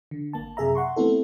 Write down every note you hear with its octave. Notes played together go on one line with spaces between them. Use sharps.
D3
G#1 A#3 A5
F#2 C3 G#4 E5 A#5
F#5 C6 C#6
A3 B3 C4 E4 A4